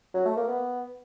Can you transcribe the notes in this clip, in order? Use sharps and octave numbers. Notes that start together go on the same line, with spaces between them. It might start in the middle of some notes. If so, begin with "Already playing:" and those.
F#3
A3
A#3
B3